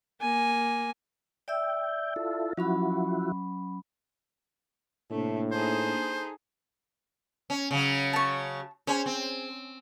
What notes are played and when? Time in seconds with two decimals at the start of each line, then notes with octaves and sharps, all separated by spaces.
0.21 A#3 G#5
1.48 D5 E5 G5 E6
2.16 E4 F4 A4
2.58 F3 F#3 C#4 E4 F#4 B5
5.11 A2 C3 A3 A#3 D4
5.52 D#4 G#4 A4 C5
7.50 C#4
7.71 C#3 F#3
8.13 A5 C#6
8.87 C#4 G#4 C5
9.06 C4